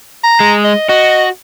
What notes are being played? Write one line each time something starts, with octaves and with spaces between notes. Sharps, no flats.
A#5
G#3
D#5
F#4 D#5